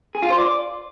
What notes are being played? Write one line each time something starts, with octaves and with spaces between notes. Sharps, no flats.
G#4
F4
C5
D5